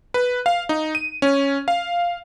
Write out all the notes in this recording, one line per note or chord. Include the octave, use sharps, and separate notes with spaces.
B4
F5
D#4
D#7
C#4
F5